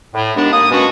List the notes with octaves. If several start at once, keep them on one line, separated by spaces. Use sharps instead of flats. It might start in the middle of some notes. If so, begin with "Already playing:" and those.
A2
D#2 G#3 B3 D4
A#3 D#6
B2 G#3 C#4 D4 F#4